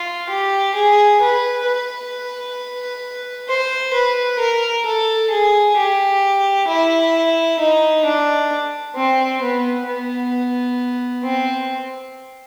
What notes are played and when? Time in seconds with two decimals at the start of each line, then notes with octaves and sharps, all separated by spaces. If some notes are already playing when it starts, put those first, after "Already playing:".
Already playing: F4
0.29 G4
0.75 G#4
1.21 B4
1.66 B4
3.48 C5
3.93 B4
4.39 A#4
4.86 A4
5.30 G#4
5.77 G4
6.68 E4
7.59 D#4
8.05 D4
8.96 C4
9.42 B3
9.87 B3
11.24 C4